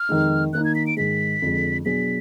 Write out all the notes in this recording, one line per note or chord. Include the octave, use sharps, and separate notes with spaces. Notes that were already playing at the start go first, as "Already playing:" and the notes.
Already playing: F6
F2 D#3 G#3 D#4
D#3 A#3 D#4 F#6
G#6
B6
D7
G#2 D#3 G#3 B6
F2 D3 F3 G#3
B2 F#3 D4 G#4 B6